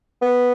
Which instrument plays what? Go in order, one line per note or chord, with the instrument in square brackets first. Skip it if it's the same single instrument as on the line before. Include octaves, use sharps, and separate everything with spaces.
[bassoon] B3